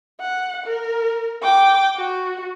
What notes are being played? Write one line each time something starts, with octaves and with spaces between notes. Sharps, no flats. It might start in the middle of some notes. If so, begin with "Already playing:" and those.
F#5
A#4
G5 D6
F#4